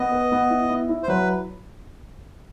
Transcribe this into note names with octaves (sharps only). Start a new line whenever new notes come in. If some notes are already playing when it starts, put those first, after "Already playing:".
Already playing: B3 D#5
B4
B3
E4
E4
E4
C5
F#3 B4